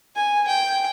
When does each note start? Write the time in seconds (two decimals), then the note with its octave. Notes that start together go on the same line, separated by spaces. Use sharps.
0.15 G#5
0.47 G5